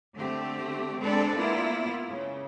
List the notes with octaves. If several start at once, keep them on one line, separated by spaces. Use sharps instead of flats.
D3 A3 C4 G4
G#3 C4 D4 A4 B4 D5
A#3 B3 E4 F4
C#3